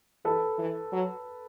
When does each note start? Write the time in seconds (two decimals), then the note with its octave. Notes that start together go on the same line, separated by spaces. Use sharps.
0.24 E3 A4 B4
0.58 E3
0.92 F#3